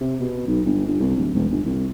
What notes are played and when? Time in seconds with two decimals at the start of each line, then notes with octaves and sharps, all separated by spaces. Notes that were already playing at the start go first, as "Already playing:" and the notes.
0.01 C3
0.20 B2
0.47 B1
0.65 G1
0.87 G1
1.00 C2
1.16 D1
1.34 E1
1.51 G1
1.66 C2